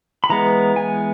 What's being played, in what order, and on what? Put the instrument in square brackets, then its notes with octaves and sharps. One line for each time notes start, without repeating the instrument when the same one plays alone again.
[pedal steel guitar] B5
E3 G#3 B3 A#5
G#5